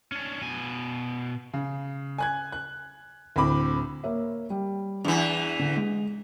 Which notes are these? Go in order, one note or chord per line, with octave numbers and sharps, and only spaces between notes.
C#4 D4
B2 G#5
C#3
G#5 F#6 G#6
F#6
D2 A2 C4 B5 D6
A#3 C#5 E5
G3
E2 E3 D4
D3
G#3